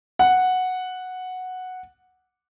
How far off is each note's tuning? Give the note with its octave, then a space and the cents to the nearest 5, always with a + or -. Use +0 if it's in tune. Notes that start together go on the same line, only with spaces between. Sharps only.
F#5 -5